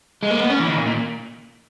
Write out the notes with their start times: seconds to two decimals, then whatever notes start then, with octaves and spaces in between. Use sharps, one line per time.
0.23 G#3
0.31 A#3
0.40 B3
0.50 C#4
0.59 E3
0.68 D#3
0.76 A#2
0.86 A#2